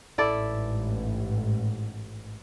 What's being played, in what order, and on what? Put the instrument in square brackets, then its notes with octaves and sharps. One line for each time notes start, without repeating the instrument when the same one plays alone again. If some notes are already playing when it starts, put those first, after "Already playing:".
[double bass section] A1 G#2 [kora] E4 A4 D5